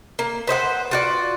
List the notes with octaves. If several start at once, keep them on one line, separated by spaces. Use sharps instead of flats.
A#3
B4 C5 D#5 F#5
F4 F#4 D5